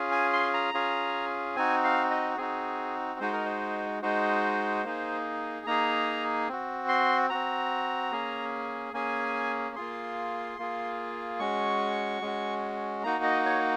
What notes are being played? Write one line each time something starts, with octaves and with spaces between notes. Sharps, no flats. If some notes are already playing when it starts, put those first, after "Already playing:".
Already playing: C#4 F4 G#4
G#5
C6
A#5
C#4 F4 G#4
C4 D#4 F#4 G#5
F5
D#5
C4 D#4 F#4 G#4
G#3 D#4 F#4 C5
A#4
C5
G#3 D#4 F#4 C5
A#3 D#4 G#4
A#3 D#4 G#4 A#5
C4 F#4
C6
C4 F#4 A#5
A#3 C#4 G#4
A#3 C#4 G#4 G#5
A#3 F4 G#4 C6
A#3 F4 G#4
G#3 C#4 F#4 C#6
G#3 C#4 F#4
A#3 D#4 F#4 A#5
D#5
C#5